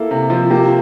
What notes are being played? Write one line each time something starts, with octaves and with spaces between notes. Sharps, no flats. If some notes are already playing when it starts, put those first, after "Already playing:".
Already playing: A#3 E4 A4
C3
F3
A#3 G4